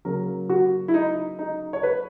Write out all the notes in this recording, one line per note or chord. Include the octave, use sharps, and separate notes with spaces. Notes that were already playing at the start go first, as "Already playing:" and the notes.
C#3 F#3 A#3 A#4
F#4
E4
D#4
D#4
C#5
B4